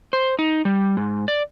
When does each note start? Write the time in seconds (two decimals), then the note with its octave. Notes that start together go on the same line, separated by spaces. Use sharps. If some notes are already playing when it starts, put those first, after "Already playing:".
0.13 C5
0.39 D#4
0.65 G3
0.97 G#2
1.28 D5